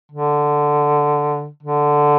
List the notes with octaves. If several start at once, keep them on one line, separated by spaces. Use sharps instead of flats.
D3
D3